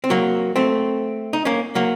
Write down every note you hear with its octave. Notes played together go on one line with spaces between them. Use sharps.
C4
F#3 A#3
A3 C4
D#4
A#3 C#4
F#3 A#3